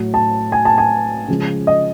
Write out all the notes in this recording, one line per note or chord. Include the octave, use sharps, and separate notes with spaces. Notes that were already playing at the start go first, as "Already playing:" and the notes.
Already playing: A2 F#3
A5
G#5
A5
G#5
C#3 F3 G#3
D#5